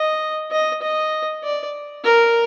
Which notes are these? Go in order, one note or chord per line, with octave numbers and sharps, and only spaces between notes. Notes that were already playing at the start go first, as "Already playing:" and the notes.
Already playing: D#5
D#5
D#5
D5
A#4